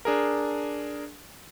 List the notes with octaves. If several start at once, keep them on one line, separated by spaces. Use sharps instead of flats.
D4 G#4 A#4